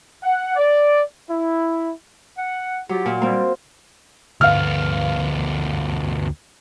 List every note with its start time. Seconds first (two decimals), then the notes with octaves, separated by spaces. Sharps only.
0.23 F#5
0.56 D5
1.30 E4
2.38 F#5
2.89 F#3 F4 G4
3.06 A#2
3.22 G3 A#3 C4
4.41 D2 B3 F5 F6